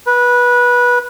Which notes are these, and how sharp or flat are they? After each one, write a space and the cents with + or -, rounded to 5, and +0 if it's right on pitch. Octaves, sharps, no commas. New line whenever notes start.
B4 -20